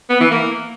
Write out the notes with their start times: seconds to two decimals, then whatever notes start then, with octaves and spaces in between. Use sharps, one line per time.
0.10 B3
0.20 E3
0.31 A#3